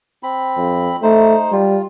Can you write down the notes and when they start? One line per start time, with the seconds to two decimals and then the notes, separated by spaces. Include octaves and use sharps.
0.23 C4 B5
0.57 F2
1.03 A3 D#4 C5
1.52 G3 F4